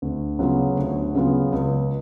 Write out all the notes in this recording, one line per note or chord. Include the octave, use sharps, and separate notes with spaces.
D2
C#3 F#3 B3 F4
D2
C#3 F#3 B3 F4
C#2